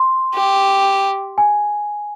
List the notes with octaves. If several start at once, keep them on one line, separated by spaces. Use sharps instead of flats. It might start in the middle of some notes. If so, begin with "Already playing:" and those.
Already playing: C6
G4
G#5